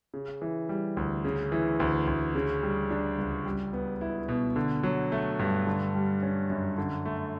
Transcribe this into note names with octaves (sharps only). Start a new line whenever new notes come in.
C#3
E3
G3
D2
C#3
E3
D2
D2
C#3
G3
D4
C#2
G3
B3
E4
B2
D3
F#3
A3
G2
D3
G3
C#4
F#2
D3
A3